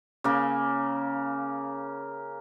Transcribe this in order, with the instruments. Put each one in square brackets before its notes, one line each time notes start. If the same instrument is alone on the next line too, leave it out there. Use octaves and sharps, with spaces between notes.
[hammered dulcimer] C#3 A#3